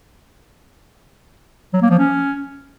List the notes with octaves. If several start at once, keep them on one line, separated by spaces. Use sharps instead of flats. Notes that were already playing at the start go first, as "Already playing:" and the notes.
F#3
A#3
F3
C#4